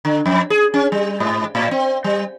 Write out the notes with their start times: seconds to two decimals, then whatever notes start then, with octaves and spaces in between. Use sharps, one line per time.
0.05 D3
0.26 F2
0.50 G#4
0.74 C#4
0.92 G3
1.20 G#2
1.55 A2
1.71 C4
2.04 G3